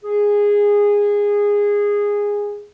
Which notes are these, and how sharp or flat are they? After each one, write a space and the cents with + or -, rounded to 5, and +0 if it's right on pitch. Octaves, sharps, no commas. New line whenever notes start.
G#4 -15